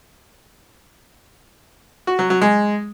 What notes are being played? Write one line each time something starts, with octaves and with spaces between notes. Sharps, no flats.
F#4
F#3
F#3
G#3